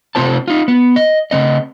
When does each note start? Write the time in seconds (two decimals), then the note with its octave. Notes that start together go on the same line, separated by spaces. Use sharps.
0.15 C3 D#3 C4 F4 C5 A5
0.48 D#4 F4
0.68 B3
0.96 D#5
1.31 C#3 F3 C4 D#5